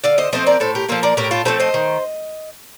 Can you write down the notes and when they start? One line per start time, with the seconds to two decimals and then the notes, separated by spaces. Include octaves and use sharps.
0.04 D3 D5 F5
0.18 C5 D#5
0.33 F3 A3 C4 C5 D#5
0.47 A#4 D5
0.60 A2 A4 C5
0.75 G4 A#4
0.88 F3 A#3 F4 A4
1.03 A#4 D5
1.17 A2 G4 A#4
1.31 F4 A4
1.45 F3 A3 C4 A4 C5
1.60 C5 D#5
1.74 D#3